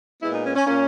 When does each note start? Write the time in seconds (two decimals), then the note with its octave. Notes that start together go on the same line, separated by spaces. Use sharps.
0.22 A#2 G#3 B3 E4
0.34 D#4
0.44 C#4
0.56 C#4
0.67 A#2 A#3 C#4